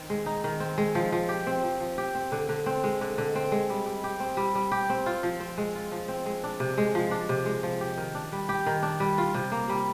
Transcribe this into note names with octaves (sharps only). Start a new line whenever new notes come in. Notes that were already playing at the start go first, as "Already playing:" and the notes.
Already playing: D#3 C4
G#3
D#4
D#3
C4
G#3
F3
F3
G4
C4
F3
F3
G4
C4
D3
D3
C4
G#3
D3
D3
C4
G#3
G3
G3
G4
C4
G3
G3
G4
C4
F4
F3
C4
G#3
F4
F3
C4
G#3
D4
C3
G#3
F3
D4
C3
G#3
F3
G4
D#3
D4
G3
G4
D#3
D4
G3
F4
C3
A#3
G3